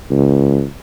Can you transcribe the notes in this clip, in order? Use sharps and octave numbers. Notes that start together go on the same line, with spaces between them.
C#2